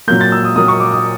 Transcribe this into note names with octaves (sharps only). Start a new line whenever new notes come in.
A#2 F#3 A#3 G6
A6
E6
D#6
A#2 F#3 A#3 D#6
C#6
D6
D#6